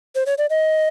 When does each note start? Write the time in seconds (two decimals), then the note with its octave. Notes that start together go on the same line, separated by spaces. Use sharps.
0.15 C5
0.26 C#5
0.38 D5
0.50 D#5